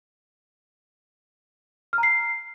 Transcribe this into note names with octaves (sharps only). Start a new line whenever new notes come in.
F6
A#5
C7